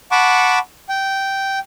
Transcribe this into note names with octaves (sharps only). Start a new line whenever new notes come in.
F#5 A5 B5 C#6 D6
G5